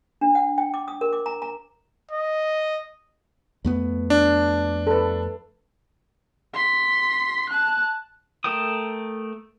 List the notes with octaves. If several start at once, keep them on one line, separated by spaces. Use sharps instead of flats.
D4
F#5
G5
D6
D#6
A#4
D6
A#5
A#5
D#5
F2 A3 B3
D4
A4 B4
C6 B6
A5 F#6
A3 A4 A#4 G5 D#6